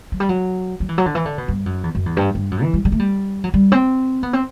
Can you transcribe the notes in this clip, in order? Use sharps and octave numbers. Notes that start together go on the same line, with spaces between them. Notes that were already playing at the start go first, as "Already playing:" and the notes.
F#3
G3
F#3
F#3
E3
F#3
D3
E3
D3
B2
G2
F#2
E2
F#2
E2
G2
G2
F#2
E3
G3
G3
A3
G3
F#3
G3
C4
B3
C4